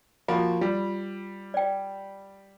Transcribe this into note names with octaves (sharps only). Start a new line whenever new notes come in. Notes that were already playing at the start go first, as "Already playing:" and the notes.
F3 A#3 F#4 B5 C#6
G3 F4
D5 G5